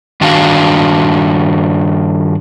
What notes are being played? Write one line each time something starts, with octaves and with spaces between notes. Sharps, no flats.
G2 D#3 D4 F#4 F5